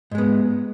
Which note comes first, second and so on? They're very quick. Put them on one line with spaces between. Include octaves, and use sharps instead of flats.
G#2 G#3 B3